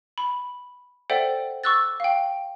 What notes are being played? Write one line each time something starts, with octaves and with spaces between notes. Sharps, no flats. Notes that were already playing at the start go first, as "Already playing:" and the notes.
B5
A4 C5 D5 E5 F#5 G5
C#6 D6 E6 F#6 A6
F5 G5